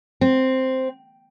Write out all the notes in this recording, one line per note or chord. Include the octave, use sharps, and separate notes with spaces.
C4